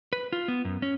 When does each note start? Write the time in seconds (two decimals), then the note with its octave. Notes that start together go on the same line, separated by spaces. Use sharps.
0.13 B4
0.33 F4
0.48 B3
0.65 F#2
0.82 C#4